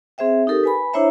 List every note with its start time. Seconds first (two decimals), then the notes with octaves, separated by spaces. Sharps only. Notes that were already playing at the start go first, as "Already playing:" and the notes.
0.18 C4 G#4 C5 E5 G5
0.47 D#4 G4 A4 A#4
0.64 B4 G#5 B5
0.93 D4 E4 C5 C#5 E5 A#5